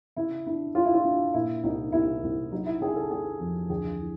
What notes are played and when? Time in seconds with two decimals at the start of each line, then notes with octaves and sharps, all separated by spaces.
0.17 C#3 E4
0.46 D4 E4
0.75 A3 F4
0.85 E4
0.94 F4
1.05 D4
1.34 A#2 E4
1.63 C2 D#4
1.92 C2 E4
2.23 C2
2.52 F#3 D#4
2.66 E4
2.81 C#3 G#4
2.96 A4
3.10 A3 G#4
3.40 F2
3.70 D2 G#4
3.99 E3